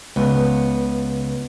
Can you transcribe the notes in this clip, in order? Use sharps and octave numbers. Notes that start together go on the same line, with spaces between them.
C#2 B3